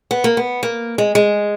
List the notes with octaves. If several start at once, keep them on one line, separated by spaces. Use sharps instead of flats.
B3
A#3
B3
A#3
G#3
G#3